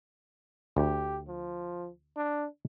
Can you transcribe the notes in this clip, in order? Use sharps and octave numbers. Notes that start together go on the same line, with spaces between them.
D2 G4
F3
D4